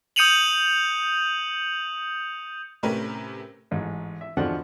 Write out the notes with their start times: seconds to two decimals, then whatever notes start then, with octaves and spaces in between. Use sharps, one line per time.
0.16 D#6 G6 C#7 D#7 F7 F#7
2.83 A2 C3 A3 C#4 A#4 B4
3.71 A1 G#2
4.21 E5
4.37 E2 B2 D3 F3 D5 F#5